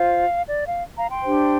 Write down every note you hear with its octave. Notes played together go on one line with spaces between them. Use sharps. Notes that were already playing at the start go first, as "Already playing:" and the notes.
Already playing: F4 C5 F5
D5
F5
F5 A#5
G5 C6
D4 G4 C5